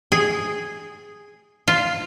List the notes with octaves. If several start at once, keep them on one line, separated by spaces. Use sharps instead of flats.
G#4
F4